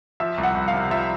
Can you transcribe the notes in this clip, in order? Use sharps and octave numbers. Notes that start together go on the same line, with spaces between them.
F3 E5
C2
F#5
C2
F5
C3
F3 E5